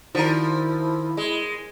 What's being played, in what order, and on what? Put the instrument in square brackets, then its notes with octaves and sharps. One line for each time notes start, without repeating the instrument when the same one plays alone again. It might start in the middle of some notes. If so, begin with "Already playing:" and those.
[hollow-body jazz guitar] D#3 D4 F#4 [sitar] F3 A#4 [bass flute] E4
[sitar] G#3